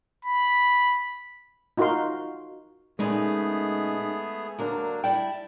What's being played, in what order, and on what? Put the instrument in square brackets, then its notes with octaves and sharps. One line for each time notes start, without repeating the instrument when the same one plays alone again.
[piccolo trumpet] B5
[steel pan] D#4 F4 F#4 A#4 F5 C6
[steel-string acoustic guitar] A#2 C#3 D#4 [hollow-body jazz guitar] G#3 [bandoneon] A3 B3 G#4
[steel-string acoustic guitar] D2 A#4 [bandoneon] F#3 A#3 D4
[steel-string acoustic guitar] G3 E4 [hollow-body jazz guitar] G5 [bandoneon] A5